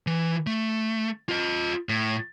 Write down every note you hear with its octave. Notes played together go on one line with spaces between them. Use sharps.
E3
A3
F4 D#5
A2